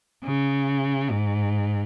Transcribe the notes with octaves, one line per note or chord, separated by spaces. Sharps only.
C#3
G#2